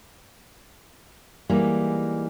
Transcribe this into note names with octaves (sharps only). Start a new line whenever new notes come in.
E3 G3 G#3 A#3 D#4